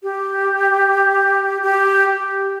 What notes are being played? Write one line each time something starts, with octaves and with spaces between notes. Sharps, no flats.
G4
G4